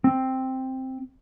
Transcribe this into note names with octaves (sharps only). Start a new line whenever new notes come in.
C4